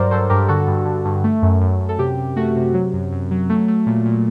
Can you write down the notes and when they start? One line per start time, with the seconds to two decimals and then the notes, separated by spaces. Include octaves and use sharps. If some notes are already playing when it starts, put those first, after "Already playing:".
Already playing: G2 F#3 A#4 C5 D5
0.11 F#3 A4 C5
0.30 G2 G4 A#4
0.48 D3 F#4 A4
0.67 G2
0.86 D3
1.05 G2
1.24 A3
1.42 F#2
1.61 F#2
1.81 F#2
1.89 A4
1.98 C3 G4
2.18 C3
2.36 A3 F#4
2.56 C3
2.74 F#3
2.93 F#2
3.12 F#2
3.31 F#3
3.49 A3
3.68 A3
3.86 A#2
4.06 A#2